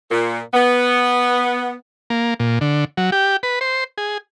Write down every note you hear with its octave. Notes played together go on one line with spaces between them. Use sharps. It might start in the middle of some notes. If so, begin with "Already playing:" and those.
A#2
B3
A#3
A#2
D3
F#3
G4
B4
C5
G#4